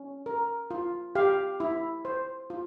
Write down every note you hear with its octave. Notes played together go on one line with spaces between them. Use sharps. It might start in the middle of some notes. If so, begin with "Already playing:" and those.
Already playing: C#4
A#4
F4
G4 F5
E4
C5
F4